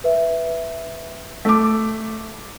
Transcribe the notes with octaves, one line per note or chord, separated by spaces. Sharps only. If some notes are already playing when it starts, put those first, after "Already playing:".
B4 E5
A3 D6